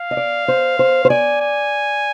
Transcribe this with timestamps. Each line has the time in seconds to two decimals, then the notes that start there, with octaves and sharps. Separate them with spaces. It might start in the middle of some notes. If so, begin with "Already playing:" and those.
Already playing: F5
0.11 D#5
0.17 D5
0.48 C5
0.79 C5
1.05 C5
1.10 D5 G#5
1.41 G#5